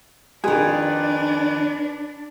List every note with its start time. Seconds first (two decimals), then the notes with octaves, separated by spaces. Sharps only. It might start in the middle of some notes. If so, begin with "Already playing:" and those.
0.44 F2 D#3 D4 G#4 B4